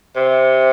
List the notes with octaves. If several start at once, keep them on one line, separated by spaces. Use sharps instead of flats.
C3